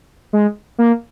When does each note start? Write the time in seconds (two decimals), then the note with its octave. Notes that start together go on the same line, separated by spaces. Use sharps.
0.33 G#3
0.78 A#3